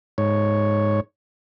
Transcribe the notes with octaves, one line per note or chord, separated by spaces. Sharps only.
G#2 C#5